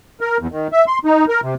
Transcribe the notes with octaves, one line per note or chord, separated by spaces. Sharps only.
A#4
E2
D#3
E5
C6
D#4
A#4
C3